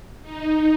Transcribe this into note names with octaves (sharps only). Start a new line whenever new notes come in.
D#4